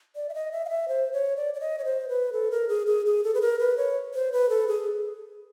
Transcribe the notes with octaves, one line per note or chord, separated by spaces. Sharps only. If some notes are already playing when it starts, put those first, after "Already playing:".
D5
E5
D#5
E5
F5
E5
C5
C#5
D5
D5
D#5
C#5
C5
B4
A4
A#4
G#4
G#4
G#4
A4
B4
A#4
B4
C#5
C5
B4
A4
G#4